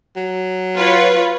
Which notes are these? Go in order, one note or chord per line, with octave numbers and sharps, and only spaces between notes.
F#3
F4 B4 C#5